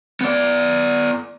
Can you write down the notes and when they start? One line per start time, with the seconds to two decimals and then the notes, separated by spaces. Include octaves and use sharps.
0.21 B3 D5